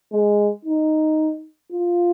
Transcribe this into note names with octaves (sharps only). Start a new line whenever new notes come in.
G#3
D#4
F4